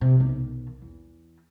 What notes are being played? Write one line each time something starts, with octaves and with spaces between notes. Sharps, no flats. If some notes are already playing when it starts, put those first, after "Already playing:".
C3
B1 D#3
E2